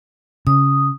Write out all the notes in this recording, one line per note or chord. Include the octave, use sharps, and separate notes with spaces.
C#3 D#6